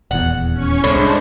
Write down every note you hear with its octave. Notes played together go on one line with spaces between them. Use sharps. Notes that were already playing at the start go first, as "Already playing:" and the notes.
D#1 E2 F#5
C#4 C#6
C2 A2 G#3 D4 C5